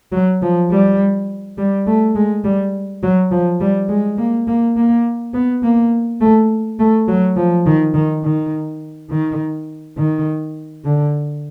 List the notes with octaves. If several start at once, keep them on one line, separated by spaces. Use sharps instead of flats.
F#3
F3
G3
G3
A3
G#3
G3
F#3
F3
G3
G#3
A#3
A#3
A#3
B3
A#3
A3
A3
F#3
F3
D#3
D#3
D#3
D#3
D#3
D3